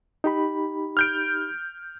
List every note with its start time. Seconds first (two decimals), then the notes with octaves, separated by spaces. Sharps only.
0.24 D#4 G4 B5
0.97 F6 G6 D7